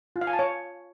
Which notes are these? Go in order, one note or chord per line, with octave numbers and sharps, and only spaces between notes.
F4
F5
G#5
A5
C#5